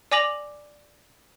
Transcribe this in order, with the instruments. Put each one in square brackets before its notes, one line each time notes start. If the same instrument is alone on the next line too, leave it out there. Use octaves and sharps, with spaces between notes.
[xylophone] D5 G#5 D6 A#6 F7 F#7